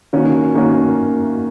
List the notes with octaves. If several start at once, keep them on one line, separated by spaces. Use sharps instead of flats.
D#3 A#3 C#4 F#4
D#3 A#3 C#4 F#4